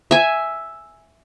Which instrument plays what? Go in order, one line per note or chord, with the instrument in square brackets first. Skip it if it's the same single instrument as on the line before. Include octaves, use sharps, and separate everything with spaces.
[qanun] E5 G#5